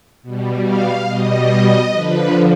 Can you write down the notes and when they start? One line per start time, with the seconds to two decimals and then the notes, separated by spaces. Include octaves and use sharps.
0.22 B2 G3
0.64 F5
1.06 B2 G3 D#5
1.90 D3 F3 B4